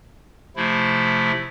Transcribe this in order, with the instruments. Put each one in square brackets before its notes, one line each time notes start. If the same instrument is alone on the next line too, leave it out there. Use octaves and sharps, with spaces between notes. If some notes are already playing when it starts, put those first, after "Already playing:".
[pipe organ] C3 F3 A3 E4